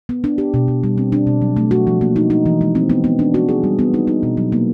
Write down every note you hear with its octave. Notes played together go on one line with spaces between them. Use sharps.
B3
D4
G4
B2
B2
G3
C4
D4
B2
F#3
A3
F#4
F3
A#3
D#4
D#4
E3
G#3
C4
B3
B3
D4
F#4
G#4
G3
B3
D#4
D#4
B2
F#3
A#3